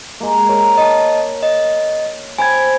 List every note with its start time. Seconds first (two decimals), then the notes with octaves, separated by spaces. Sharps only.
0.20 G#3 A#3
0.49 A#4 C#5
0.77 D#5 A5
1.43 D#5
2.38 C5 G5 G#5 B5 G#6